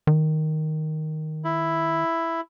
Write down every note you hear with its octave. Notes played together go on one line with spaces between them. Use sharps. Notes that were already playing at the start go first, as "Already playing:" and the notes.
D#3
E4